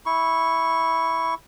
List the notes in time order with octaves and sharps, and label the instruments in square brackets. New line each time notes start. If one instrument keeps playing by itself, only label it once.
[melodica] E4 C#6